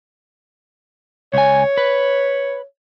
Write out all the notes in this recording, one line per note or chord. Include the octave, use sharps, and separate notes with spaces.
C#2 C#5 G#5
B4